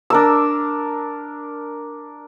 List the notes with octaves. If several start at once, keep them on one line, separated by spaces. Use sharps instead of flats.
D4 A#4 E6